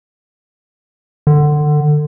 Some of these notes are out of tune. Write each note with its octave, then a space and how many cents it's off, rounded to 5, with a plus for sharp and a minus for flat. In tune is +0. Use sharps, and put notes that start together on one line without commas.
D3 +25